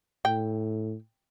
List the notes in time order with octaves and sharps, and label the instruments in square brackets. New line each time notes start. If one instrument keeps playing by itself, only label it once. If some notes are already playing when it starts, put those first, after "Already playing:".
[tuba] A2 [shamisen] G5